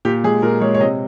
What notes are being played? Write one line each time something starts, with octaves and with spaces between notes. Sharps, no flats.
A#2 G4
G#3 G#4
A#2 A#4
G#3 C#5
C#5
C3 D#5